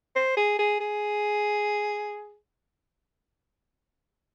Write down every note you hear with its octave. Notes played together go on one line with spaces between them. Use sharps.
C5
G#4
G#4
G#4